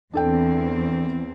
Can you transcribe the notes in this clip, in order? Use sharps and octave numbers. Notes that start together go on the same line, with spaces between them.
E2 C4 D4 A4 G5